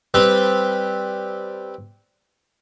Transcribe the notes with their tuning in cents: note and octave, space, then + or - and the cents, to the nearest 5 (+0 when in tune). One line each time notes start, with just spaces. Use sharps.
G3 +0 C4 +0 B4 +0